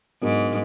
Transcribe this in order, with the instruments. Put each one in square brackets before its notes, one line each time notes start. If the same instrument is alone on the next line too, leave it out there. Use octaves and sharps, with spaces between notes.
[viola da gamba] G#2 [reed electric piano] F#3 B3 D4 F#4 A#4